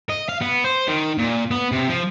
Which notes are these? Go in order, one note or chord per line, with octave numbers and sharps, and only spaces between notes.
D#5
F5
B3
C5
D#3
A#2
B3
C3
F3